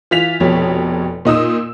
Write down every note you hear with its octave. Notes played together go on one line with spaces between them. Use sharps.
E3 F4 B6 F7
F1 F2 B2 C#5
A#2 D#4 D#6 E6